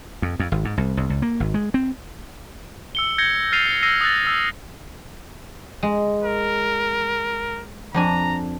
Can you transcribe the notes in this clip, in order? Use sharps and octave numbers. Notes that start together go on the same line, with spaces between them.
F2
F2
G#1
G#2
C2
C2
C#2
A#3
G#1
G#3
C4
E6 C#7 G7
G6 G#6 A#6 C#7 G7
F6 A6 C7 D#7 F7
E6 A#6 C7 C#7 D#7
D#6 E6 F#6 A6
E6
G#3
A#4
F2 D4 G#5 A#5